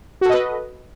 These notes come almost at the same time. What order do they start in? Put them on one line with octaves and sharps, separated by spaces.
F#4 A4 D#5 B4